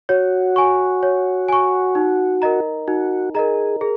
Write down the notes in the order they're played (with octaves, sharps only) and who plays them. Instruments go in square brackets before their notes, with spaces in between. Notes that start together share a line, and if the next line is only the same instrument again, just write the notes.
[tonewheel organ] F#4 [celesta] C#5
[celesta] G#5 C#6
C#5
G#5 C#6
D#4
A#4 D#5 A#5
[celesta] D#4 [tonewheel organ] F#4
[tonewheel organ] G#4 [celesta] A#4 D#5 A#5
[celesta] G#4 [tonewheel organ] A#4